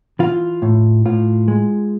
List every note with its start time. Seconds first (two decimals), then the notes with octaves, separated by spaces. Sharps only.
0.19 E3 F4
0.62 A2
1.05 A2 F4
1.48 G#3